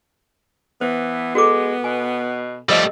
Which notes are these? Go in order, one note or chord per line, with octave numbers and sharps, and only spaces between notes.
E3 B3 C5
G#3 F#4 A4 D6
B2 G#5
F3 G3 A3 A#4 C#5 D#5